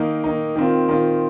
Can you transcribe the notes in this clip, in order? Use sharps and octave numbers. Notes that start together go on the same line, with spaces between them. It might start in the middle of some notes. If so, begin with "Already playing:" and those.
Already playing: D#3 A#3 D#4
D#3 A#3 D#4
D#3 C4 F4
D#3 C4 F4